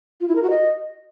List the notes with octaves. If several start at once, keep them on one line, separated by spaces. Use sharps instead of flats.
F4
E4
A#4
F#4
D#5